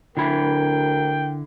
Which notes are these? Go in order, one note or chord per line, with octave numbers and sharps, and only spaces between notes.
D2 D3 E4 A#4 G5 B5